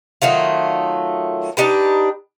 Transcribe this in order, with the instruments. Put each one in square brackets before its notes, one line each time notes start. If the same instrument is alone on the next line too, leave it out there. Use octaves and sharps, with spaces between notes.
[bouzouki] D#3 F#3 A3 F4
D4 D#4 G4 B4